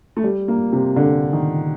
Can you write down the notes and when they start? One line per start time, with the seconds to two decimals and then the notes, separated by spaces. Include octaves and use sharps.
0.17 A3
0.24 G3
0.48 A#3
0.72 C3
0.96 D3
1.33 D#3